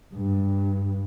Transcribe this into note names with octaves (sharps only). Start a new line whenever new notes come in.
G2